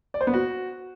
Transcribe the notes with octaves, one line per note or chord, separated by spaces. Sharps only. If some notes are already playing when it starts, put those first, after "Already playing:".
D5
C5
B3
F#4